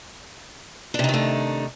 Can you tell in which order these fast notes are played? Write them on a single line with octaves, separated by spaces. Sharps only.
D4 C3 D#4 D#3 A3